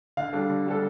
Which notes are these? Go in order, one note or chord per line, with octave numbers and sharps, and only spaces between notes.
D3 F5
G3 D4 A4
D3
G3 D4 A4